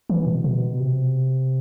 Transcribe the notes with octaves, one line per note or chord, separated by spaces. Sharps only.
E3
B2
B2
C3